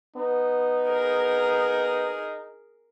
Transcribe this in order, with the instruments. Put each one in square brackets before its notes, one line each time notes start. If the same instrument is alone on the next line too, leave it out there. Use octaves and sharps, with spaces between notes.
[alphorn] B3 [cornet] D#4
[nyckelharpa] G#4 A#4